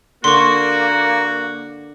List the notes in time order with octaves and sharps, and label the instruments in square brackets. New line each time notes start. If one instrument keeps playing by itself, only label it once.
[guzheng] D3 [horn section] A#3 [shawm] F#4 [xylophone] C6 C#6